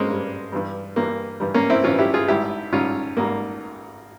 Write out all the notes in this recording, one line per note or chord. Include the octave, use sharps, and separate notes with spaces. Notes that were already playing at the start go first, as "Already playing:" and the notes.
Already playing: G#3 A#3 C4 C#4
G2 G3
G2 E3 G3
G2 E3 G3 A#3
G2 E3 G3
A#3 C#4
C4 E4
G2 E3 G3 C#4 F4
E4 G4
F4 G#4
G#1 G#2 G3 E4 G4
G#1 G#2 G3 C#4 F4
G#1 G#2 G3 A#3